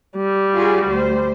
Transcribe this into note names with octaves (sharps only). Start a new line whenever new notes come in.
G3
F4 F#4 G#4
D2 C5